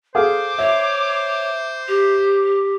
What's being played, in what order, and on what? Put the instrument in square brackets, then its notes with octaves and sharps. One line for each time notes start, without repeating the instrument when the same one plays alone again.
[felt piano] G#4 A4 F5 [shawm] C5 [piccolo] D6
[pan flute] C#5 [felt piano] E5
[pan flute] G4